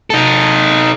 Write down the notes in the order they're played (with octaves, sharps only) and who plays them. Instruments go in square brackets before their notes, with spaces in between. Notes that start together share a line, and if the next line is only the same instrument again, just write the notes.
[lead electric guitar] D#4 A4